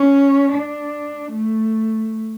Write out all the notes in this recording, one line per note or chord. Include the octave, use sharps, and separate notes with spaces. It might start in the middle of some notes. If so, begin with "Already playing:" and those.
Already playing: C#4
D4
A3